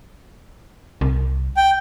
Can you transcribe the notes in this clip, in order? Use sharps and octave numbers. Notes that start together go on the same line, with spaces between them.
C2
G5